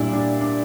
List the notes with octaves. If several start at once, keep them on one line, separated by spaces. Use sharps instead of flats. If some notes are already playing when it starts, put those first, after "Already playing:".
Already playing: A#2 G3 D4 E4
D4
D4